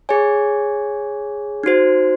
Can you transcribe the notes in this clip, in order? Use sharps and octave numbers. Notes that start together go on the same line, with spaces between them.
G#4 C#5 G#5
D#4 F#4 C5